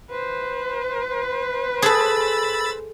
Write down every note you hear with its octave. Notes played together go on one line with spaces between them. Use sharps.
B4 C5
G#4 A4 B5 E6 A6